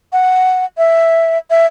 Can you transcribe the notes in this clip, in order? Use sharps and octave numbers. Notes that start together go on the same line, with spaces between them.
F#5
E5
E5